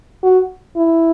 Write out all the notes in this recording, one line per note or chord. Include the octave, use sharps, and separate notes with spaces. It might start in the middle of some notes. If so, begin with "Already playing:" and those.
F#4
E4